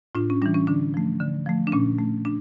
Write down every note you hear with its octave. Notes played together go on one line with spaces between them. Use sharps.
A2 D4 F4
C#4
E3 G3 D4
C#4
D3 D4
F3 A3
D3
F3 A3
D4
A#2 C#4
A3
D4